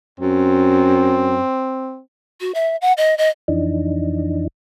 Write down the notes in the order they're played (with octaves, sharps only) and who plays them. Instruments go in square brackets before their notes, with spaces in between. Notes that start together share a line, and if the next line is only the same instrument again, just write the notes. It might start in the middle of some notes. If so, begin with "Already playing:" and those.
[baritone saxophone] F#2 [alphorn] C4
[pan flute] F#4
E5
F#5
D#5
D#5
[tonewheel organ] F2 E3 D4 D#4